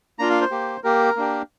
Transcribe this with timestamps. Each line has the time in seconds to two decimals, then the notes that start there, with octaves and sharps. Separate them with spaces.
0.19 A#3 D4 F4 A#5
0.30 F5
0.41 C5
0.51 A#3 G4
0.84 A#3 G4 A#4
1.16 A#3 D4 G4